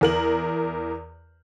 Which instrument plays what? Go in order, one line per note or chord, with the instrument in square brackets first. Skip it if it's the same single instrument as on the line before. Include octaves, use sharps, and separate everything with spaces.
[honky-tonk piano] E2 A#4 F#7